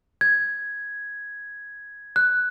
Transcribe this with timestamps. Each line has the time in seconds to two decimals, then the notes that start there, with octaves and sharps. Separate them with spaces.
0.21 G#6
2.16 F#6